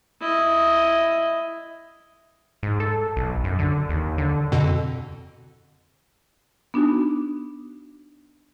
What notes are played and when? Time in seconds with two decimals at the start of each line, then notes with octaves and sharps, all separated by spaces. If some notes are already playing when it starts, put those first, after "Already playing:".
0.20 E4 D#5
2.63 G#2
2.80 A4
3.17 B1
3.44 F#2
3.59 D3
3.89 D#2
4.18 D3
4.52 F2 B2 D3
6.74 B3 D4 D#4 F#4